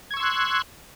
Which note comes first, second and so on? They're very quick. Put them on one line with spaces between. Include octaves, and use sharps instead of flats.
G#6 C#6 E6 C6 F#6